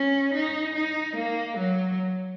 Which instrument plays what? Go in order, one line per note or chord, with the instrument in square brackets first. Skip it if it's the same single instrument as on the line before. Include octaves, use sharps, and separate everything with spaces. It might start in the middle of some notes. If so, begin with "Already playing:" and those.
Already playing: [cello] C#4
D#4
D#4
A#3
F#3